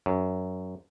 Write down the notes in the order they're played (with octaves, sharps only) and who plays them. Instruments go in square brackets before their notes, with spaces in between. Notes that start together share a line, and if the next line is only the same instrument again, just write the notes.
[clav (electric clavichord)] F#2